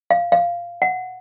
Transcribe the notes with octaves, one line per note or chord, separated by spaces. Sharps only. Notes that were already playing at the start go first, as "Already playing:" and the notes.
F5
F5
F#5